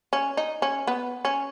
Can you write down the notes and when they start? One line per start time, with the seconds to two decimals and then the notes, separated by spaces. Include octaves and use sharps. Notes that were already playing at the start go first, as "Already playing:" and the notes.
0.13 C#4
0.37 D#4
0.62 C#4
0.87 B3
1.25 C#4